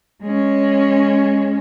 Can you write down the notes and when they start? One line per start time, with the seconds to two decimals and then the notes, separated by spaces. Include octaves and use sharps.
0.22 G#3 C#4